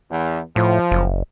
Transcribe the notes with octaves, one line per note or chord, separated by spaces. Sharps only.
E2
A2 F3
F#1